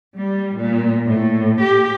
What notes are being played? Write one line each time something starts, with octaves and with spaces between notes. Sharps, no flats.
G3
A#2
A2
G4